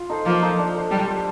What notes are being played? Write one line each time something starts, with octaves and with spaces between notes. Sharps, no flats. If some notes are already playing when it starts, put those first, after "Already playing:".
Already playing: F4
D#4 A4 C5
F3 A#3
D#4 A4 C5
D4
A4 C5
G3 D4
A4 C5